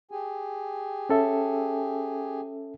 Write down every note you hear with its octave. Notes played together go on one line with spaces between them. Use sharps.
G4 G#4 G#5
C#4 A4 E5